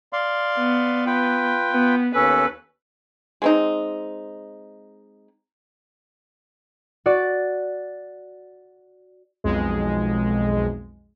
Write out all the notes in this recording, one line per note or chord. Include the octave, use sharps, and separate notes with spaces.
D5 F5 C6
B3
F4 B4 G5
B3
D#2 C#4 A4 B4
G#3 C4 D#4
F#4 D5
B1 F2 G#3